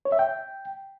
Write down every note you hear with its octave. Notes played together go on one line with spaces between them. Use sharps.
C#5
E5
G5